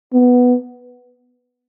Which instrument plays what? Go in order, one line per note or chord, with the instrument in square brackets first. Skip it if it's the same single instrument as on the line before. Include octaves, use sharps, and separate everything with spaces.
[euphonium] B3